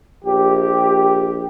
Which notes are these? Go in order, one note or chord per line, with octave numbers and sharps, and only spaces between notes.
A#1 G4